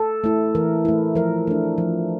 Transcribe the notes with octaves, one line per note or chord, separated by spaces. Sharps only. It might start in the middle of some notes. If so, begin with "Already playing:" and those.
Already playing: A4
A3 E4
E3 A#4
A3 E4
F3 A#4
A3 D4
F3